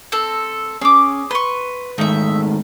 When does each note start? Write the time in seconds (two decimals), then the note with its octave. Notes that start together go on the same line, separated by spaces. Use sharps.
0.12 C4 A4
0.81 C#4 G#4 D6
1.31 B4 C6 C#6
1.98 G#2 D#3 A3 D#4 E5